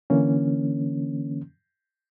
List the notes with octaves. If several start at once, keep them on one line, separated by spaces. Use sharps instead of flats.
D3 E3 A#3 C#4